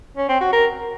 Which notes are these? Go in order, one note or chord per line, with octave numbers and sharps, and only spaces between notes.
C#4
C4
F#4
A#4